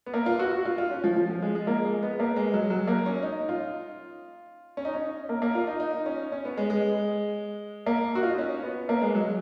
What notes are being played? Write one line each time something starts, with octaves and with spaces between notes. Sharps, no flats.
B3
A#3
F4
F#4
F#4
F4
F4
C#4
F3
F3
F3
G#3
G#3
A#3
G#3
B3
A#3
G#3
F#3
F#3
A#3
C#4
D#4
F4
C#4
D#4
C#4
A#3
A#3
F4
D#4
D#4
C#4
C#4
B3
G#3
G#3
A#3
F#4
F4
D#4
C#4
B3
A#3
G#3
F#3